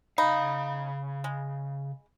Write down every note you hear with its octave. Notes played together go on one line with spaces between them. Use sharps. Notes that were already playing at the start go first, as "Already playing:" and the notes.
C#3 D#4 F5 B5
G#3